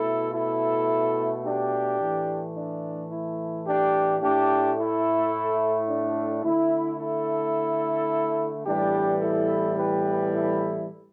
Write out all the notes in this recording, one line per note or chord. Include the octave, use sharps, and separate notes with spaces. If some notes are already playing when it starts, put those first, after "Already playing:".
Already playing: B2 A3 E4 A4
E4 A4
D4 G4
A2 E3 A3
D4
E4
D4 G4
A2 A3 D4 G4
E4 A4
D4
D3 A3 E4
E4 A4
A2 E3 G3 B3 D4 G4
E4 A4
G4 B4
E4 A4